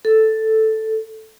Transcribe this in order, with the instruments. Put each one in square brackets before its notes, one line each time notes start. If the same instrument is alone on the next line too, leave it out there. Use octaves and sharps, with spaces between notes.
[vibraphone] A4